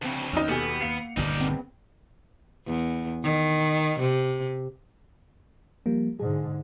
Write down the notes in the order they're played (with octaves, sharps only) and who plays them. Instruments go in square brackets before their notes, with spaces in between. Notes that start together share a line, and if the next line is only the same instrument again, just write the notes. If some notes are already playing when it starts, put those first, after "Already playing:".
[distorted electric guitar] D2 C#3 [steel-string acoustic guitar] F3 C4
[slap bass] D#2 [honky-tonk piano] C#4 D#4
[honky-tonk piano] B2 G4 [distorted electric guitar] B3 [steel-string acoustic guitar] A4 G#5
[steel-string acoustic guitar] A#3 F#5 [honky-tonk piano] C7 C#7 F7
[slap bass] G1 D#2 A#2 [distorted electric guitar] D#4 D5
[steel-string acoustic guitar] E2 G2 C4
[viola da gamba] E2
D#3
C3
[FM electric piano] F3 G3 A#3
[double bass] G#2 D3 [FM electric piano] G#4